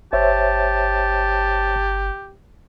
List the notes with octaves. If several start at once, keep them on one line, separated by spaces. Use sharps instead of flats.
G1 G4 C5 C#5 E5 A5